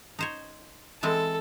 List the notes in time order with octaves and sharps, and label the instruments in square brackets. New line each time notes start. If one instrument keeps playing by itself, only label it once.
[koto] D#4 C5 C#5
[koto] E3 G#3 C4 [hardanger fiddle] A4